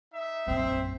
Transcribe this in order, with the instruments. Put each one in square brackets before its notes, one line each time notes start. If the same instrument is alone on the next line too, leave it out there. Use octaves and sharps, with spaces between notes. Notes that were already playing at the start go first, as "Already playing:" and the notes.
[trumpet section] D#4 E5
[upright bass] A#1 F#2 [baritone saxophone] C4